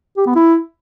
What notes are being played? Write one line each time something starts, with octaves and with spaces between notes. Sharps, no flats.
G4
B3
E4